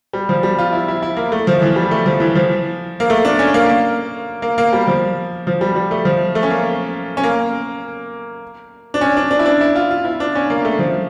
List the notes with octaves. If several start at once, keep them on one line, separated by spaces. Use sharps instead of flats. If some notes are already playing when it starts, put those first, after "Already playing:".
G3
F3
G3
F4
E4
E4
E4
A#3
A3
F3
E3
G3
A3
F3
E3
F3
A#3
A3
D4
C#4
A#3
A#3
A#3
A#3
G3
F3
F3
G3
G3
A3
F3
A3
C#4
A#3
C#4
A#3
D4
C#4
D4
D4
E4
D4
E4
F4
F4
E4
D4
C#4
A#3
A3
F3